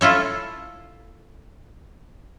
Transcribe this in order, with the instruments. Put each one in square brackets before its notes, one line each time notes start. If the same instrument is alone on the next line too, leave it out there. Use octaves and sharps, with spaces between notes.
[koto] E4 F4 A4 C#5